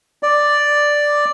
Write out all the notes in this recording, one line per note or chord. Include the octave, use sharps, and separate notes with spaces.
D5